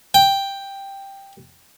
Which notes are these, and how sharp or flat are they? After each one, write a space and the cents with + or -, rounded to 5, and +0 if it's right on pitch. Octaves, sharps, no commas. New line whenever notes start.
G5 +5